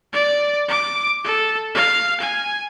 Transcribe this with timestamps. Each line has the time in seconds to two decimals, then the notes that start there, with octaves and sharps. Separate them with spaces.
0.13 D5
0.68 D6
1.24 A4
1.75 F5
2.21 G#5